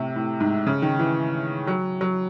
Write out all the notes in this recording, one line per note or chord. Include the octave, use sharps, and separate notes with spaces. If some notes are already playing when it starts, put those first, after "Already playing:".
Already playing: A2 C3
A2
G#2
C#3
D#3
E3
F#3
F#3